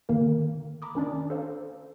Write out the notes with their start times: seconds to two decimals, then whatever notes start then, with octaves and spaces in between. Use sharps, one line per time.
0.09 D3 D#3 A#3 A#4
0.82 A#5 B5 D6 D#6
0.95 D#3 C#4 D4 D5
1.30 A4 C5 F5